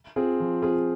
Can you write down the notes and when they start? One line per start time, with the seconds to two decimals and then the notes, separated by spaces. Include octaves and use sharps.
0.16 C4 F4 G#4
0.40 F3
0.62 C4 F4 G#4